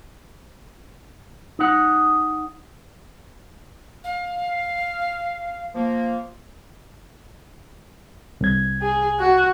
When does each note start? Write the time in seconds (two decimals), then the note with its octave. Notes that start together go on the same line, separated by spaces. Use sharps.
1.59 D#4 F#5
4.04 F5
5.75 F3 A#3
8.41 C2 G#6
8.82 G#4
9.20 F#4